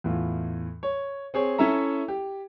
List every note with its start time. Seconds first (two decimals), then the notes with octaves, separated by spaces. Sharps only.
0.04 E2 A2 F4
0.83 C#5
1.34 C4 G#4 C#5
1.58 C#4 E4 A4 E5 A#5
2.08 G4